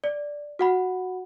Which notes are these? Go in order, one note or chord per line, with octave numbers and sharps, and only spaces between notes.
D5
F#4 F#5 B5